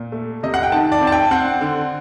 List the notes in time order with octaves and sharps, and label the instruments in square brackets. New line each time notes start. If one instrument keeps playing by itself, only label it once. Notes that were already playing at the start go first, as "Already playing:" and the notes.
Already playing: [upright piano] A#2
A3
C3 D#5
F#5
G5
D#3 A5
D5
C4
A5
G5
C4 F#5
D3